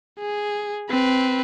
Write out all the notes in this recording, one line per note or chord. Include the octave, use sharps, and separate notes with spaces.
G#4
C4 B4